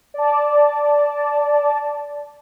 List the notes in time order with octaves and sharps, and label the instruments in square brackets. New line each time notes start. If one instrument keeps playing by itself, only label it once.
[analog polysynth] D5 A5